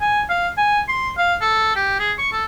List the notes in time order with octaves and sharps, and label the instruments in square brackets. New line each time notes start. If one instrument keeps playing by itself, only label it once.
[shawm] G#5
F5
G#5
C6
F5
A4
G4
G#4
C#6
A4